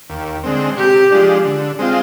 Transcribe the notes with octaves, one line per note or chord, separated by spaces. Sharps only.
D#2
D3 G#3 C4
C3 G4
F3 G#3 D4
D3
G#3 C4 F4